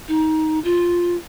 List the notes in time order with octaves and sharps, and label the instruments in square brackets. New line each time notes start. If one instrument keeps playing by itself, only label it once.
[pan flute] D#4
F4